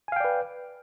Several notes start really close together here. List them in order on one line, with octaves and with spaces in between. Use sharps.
G#5 F5 G5 D5 B4